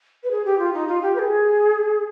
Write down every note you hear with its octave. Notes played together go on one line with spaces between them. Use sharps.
B4
G#4
G4
F4
D#4
F4
G4
B4
G#4